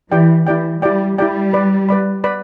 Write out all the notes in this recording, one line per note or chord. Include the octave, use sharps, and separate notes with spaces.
E3 E4 G4 D5 G5
E3 E4 G4 D5 G5
G3 E4 G4 D5 G5
G3 E4 G4 D5 G5
B4 D5 B5
B4 D5 B5
B4 D5 B5